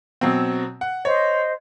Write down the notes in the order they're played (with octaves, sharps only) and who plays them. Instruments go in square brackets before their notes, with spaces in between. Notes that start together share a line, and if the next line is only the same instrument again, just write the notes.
[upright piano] B2 F#3 C4
F#5
[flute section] C5 D#5 [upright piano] C#5